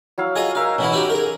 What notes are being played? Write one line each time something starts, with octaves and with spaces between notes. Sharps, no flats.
F#3 E4 F5
F4 G#4 D#5 G#5
D#4 A#4 E5 F5
B2 E3 C#4 E4
D#4 F#4 G4
G#4 A#4